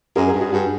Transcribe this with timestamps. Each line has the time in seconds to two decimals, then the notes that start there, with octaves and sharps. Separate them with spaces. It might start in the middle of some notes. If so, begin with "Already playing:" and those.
0.16 F#2 G#4 A#4
0.28 G#4 A#4
0.34 G2
0.40 F#4 G#4
0.52 G2 F#4 G#4